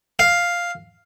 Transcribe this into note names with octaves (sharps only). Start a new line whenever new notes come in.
F5